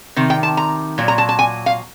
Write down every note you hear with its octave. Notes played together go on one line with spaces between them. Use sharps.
C3 D#3
G5
A5
A#5
A#2 F#3
A#5
A5
A5
G#5
F5